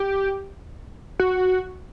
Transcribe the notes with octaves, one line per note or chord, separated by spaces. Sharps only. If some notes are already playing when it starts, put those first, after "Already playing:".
Already playing: G4
F#4